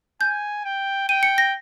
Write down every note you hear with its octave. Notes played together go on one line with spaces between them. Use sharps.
G#5 G6
G5
G5 D#7
C#7
A#6